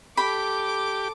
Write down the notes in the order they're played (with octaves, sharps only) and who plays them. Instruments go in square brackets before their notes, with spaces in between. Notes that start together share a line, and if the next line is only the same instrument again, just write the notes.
[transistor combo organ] G4 [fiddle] A4 D6 [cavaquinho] B5